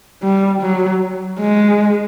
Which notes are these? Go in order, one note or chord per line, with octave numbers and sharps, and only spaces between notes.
G3
F#3
G#3